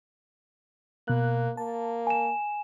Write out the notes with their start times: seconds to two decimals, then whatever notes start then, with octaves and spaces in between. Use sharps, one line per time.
1.08 B2 A#3 F#6
1.57 A#3 A5
2.07 G#5 E7